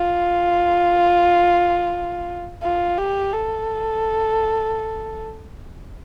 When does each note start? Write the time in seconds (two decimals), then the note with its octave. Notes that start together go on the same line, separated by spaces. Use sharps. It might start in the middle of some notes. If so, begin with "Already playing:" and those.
Already playing: F4
2.63 F4
2.98 G4
3.33 A4